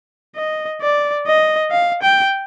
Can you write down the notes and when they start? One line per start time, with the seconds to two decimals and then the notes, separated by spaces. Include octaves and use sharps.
0.36 D#5
0.81 D5
1.27 D#5
1.71 F5
2.02 G5